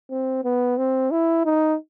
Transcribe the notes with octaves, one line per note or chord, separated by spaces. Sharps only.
C4
B3
C4
E4
D#4